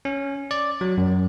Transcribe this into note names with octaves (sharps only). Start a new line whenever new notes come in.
C#4
D5
F#3
F#2